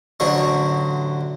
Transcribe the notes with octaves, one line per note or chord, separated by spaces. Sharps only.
A1 D3 F#3 C5 C#6